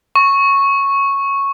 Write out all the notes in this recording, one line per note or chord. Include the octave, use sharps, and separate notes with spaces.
C#6